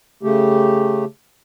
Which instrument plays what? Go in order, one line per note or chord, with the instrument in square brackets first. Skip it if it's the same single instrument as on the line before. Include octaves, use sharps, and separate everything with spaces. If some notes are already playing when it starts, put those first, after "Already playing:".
[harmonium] C#3 A3 G4